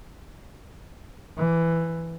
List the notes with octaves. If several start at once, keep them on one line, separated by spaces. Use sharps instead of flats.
E3